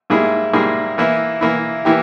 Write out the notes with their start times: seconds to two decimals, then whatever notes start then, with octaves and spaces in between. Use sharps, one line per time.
0.10 G#2 G3 A#3 E4 G#4
0.53 G#2 G3 A#3 E4 G#4
0.98 E3 A#3 E4
1.41 E3 A#3 E4
1.85 E3 A#3 E4 G4